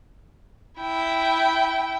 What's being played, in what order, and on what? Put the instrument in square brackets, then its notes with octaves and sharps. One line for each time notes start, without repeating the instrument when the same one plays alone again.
[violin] E4 G5